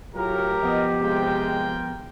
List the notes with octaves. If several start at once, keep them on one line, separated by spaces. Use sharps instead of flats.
A2 F#3 F4 G4 A#4
F3 B3 D#5
C3 G#3 F4 A#4 G5